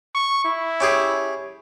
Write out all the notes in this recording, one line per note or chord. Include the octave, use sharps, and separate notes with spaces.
C#6
E4
C#4 G4 G#4